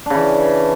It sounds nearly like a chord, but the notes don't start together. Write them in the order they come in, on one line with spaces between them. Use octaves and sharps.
D4 C#3 E3